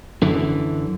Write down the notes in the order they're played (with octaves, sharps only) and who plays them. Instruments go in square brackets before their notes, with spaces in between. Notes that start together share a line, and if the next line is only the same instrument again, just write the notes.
[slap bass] F#2 D3 E3